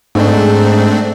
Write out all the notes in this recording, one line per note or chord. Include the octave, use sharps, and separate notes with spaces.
G#2 A3 C4 D4